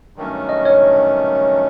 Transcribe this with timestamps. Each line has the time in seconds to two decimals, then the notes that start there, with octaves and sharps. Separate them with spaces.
0.16 G2 D#3 F#3 A3 C#4
0.49 D#5
0.65 C#5